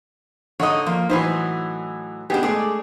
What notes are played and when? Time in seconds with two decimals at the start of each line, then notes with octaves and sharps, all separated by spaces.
0.60 D3 D#4 C#5 D#5
0.86 F3 A#3
1.10 A2 E3 F#3 D#4 B4 C5
2.30 B2 B3 D4 G4 G#4
2.43 G#3 A3 G#4 D5